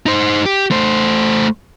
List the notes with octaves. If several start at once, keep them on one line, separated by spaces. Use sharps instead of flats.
D#4 C5
G4
A3 C5